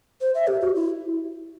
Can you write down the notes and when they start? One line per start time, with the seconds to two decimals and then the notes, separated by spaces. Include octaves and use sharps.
0.21 C5
0.35 E5
0.47 G4
0.61 F#4
0.75 E4